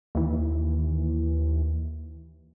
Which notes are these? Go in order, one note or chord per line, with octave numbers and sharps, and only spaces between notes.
D#2 E3